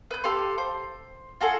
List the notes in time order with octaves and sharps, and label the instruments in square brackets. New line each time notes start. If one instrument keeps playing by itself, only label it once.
[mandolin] B4 G6
G4 A4 F5 C6
C5
F4 F#4 G#4 A4